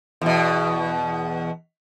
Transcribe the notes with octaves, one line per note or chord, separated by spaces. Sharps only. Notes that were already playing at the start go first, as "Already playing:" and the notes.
E2 B2